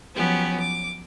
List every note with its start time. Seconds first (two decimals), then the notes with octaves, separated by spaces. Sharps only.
0.15 F3 F#3 B3 C#4 G4
0.60 D6